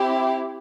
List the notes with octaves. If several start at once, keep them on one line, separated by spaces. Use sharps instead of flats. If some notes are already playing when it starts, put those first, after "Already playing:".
Already playing: C4 E4 G4